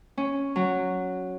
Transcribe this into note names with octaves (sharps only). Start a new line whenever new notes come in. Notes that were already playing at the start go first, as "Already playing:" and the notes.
C#4
F#3